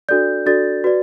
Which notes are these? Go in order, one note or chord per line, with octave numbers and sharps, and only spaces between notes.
D4 F#4 A4 D5 G6
D4 F#4 A4 D5 A6
F#4 B4 D5